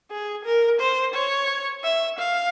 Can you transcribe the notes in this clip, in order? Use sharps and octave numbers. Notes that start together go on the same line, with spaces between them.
G#4
A#4
C5
C#5
E5
F5